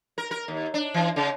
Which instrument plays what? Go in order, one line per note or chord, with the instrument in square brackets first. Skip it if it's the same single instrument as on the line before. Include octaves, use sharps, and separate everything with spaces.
[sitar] A#4
A#4
D#2
D4
E3
C#3